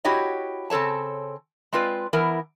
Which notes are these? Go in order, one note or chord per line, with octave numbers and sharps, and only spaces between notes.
E4 F#4 G4 C#5 D#5
C#3 C4 A4 C#5 A5
G#3 C4 F4 B4 D5
E3 B3 E4 A#4